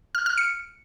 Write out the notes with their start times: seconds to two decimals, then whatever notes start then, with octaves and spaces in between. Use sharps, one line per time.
0.15 F6
0.26 F6
0.38 C#7